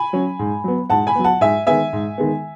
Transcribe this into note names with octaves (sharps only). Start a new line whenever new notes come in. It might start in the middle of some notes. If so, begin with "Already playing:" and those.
Already playing: G#5 B5
F#3 C#4
G#2
F#3 B3
G#2 F#5 A5
G#5 B5
F#3 B3
F#5 A5
G#2 E5 G#5
D#3 G#3 B3 E5 G#5
G#2
D#3 G#3 B3